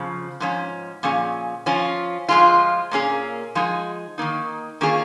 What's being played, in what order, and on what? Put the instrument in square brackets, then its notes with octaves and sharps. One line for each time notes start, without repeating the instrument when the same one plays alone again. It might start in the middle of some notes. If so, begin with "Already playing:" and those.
Already playing: [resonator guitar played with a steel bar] F2 C#3 F3
G#2 F3 C#4
A#2 F3 C#4 G#4
F3 C#4 F4
F3 G#3 F4
A#2 A#3 C#4 G#4
F3 G#3 D#4 G#4
D#3 A#3 D#4
D#3 A#3 C#4 F4 G#4